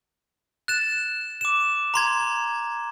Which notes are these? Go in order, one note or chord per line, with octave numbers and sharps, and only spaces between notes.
F#6 A6 E7
D6 E7
A#5 C6 G#6